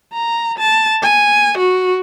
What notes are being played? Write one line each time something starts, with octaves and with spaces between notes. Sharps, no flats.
A#5
A5
G#5
F#4